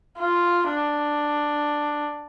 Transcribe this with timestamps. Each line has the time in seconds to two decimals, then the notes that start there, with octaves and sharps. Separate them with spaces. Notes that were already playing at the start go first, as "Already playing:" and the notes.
0.18 F4
0.67 D4